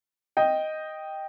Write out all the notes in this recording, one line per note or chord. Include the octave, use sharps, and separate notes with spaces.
D#5 G5